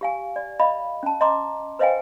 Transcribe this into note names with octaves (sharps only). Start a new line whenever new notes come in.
G4 F5 G#5
D5
D#5 F5 B5
C#4 A5
D#5 A#5 C6 D6
B4 C5 D#5 F5 G5 G#5